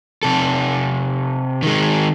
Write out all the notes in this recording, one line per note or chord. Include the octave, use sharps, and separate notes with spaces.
C3 A4
D#3 G#3